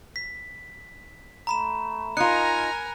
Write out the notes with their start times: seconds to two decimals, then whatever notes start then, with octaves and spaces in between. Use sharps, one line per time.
0.16 B6
1.47 A3 A#5 B5 E7
2.17 D#4 F4 A#4 G#5 A#5 F#6 C#7